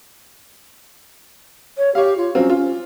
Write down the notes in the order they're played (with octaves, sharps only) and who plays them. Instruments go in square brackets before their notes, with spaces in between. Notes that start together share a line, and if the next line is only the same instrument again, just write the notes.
[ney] C#5
[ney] G4 [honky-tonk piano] C#5 F5
[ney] F4
[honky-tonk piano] F#3 C4 F4 [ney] C#4
[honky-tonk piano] F4